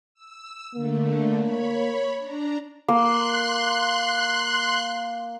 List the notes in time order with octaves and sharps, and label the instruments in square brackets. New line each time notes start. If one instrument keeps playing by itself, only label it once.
[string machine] E6
[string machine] D3 A3 [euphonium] A#3
[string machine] C#5 B5
D4 A#5
[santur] A#3 [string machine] C6 F#6